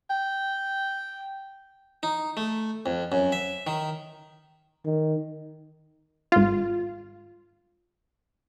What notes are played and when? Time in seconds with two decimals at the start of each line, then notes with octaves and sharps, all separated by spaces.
0.10 G5
2.03 D#4
2.37 A3
2.86 F2
3.12 F#2
3.32 E5
3.67 D#3
4.85 D#3
6.32 G#1 F4